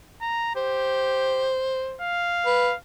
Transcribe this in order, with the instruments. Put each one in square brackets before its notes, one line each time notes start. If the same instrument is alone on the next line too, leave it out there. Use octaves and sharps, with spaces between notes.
[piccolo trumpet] A#5
[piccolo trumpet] G4 [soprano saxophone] C5
[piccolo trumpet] F5
[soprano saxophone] B4